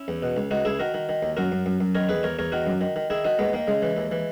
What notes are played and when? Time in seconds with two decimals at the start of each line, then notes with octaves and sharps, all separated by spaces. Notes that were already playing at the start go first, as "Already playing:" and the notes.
Already playing: C#4 E4
0.08 E2
0.23 B2
0.36 C#2
0.51 C#2 D#4 F#4
0.65 C#2 E4 G#4
0.79 D#3 F#4 A#4
0.94 D#3
1.09 D#3
1.23 D#2
1.37 F#2 F#4 A#4
1.52 F#2
1.66 F#2
1.80 F#2
1.95 D#3 A#4 C#5
2.09 E2 G#4 B4
2.23 E2 A#4 C#5
2.39 E2 A#4 C#5
2.52 D#3 F#4 A#4
2.67 F#2
2.81 D#3
2.96 D#3
3.10 D#3 E4 G#4
3.24 D#3 D#4 F#4
3.39 D#2 G#3 B3
3.53 D#3 A#3
3.67 C#3 G#3
3.82 E3
3.97 D#2
4.12 E3